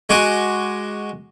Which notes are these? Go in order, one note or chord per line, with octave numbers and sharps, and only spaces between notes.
G#3 F#4 G#5 D6